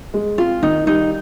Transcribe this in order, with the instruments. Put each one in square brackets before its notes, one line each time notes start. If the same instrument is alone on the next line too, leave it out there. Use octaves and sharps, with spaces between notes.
[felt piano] G#3
[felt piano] C4 [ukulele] F4
[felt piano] D#3 [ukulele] D#4
[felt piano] G3 [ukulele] D#4